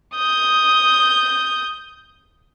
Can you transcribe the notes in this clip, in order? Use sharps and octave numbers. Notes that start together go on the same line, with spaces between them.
D#6 G6